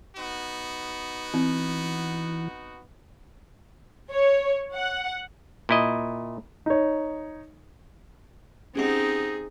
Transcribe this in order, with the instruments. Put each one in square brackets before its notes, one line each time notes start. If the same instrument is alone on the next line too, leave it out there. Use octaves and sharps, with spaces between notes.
[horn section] B3 D#4 F#4
[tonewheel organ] E3 [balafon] C4
[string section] C#5
F#5
[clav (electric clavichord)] A#2 E4 D#5
[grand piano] D#4 C#5
[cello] C4 D#4 [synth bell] C#4 G4 F#5 [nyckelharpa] G#4